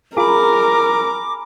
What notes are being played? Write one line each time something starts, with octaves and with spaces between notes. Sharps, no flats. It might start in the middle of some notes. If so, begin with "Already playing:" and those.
F4 G#4 A#4 G#5 A#5 B5 D6